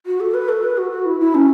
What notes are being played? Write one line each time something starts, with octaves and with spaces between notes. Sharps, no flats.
F#4
A4
B4
A4
B4
F#4
F#4
E4
E4
C#4